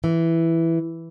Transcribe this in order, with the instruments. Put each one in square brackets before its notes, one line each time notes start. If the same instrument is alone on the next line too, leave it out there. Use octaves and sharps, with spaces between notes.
[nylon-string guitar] E3